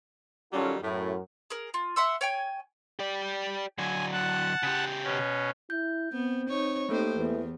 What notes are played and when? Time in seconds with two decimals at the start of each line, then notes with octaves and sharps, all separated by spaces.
0.53 D#3 F#3 G3 C#4 F4 A4
0.83 F#2 A2
1.50 G#4 A#4
1.74 F4
1.96 E5 F#5 C6 E6
2.21 C#5 G5 G#5
2.99 G4 D5
3.78 D3 F#3 G#5
4.13 F#5 A5
4.63 C#3 G4
5.04 B2 C#4
5.70 E4 G6
6.12 B3 C4
6.49 D#4 C#5
6.89 A3 A#3 D#4 G4 A4 C5
7.17 E2 E3